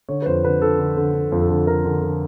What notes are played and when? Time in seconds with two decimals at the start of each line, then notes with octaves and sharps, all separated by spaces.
0.09 D3 C#5
0.22 B4
0.26 F2 C5
0.44 D3 B4
0.62 D3 A4
0.79 D3
0.97 D3
1.14 D3
1.32 F2
1.41 A4
1.49 D3
1.67 D3 A#4
1.85 D3
2.02 D3